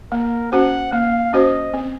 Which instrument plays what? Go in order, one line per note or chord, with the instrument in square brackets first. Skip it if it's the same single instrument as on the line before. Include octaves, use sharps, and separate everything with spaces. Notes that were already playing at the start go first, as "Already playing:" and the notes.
[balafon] A#3 [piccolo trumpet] A#4
[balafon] C#4 F#4 C5 [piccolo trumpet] F#5
[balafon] A#3 [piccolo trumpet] F5
[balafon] C#4 F#4 C5 [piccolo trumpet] D#5
[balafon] C4